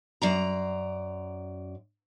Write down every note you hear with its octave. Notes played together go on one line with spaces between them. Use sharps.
F#2 D5 A#5